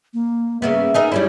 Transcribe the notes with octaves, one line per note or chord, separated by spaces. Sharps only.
A#3
C#3 A#3 B3 E5
D#4 G#4 A#4
G3 C#4 E4 C#5